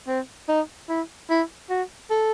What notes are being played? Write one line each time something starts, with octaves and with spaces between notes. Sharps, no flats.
C4
D#4
E4
E4
F#4
A4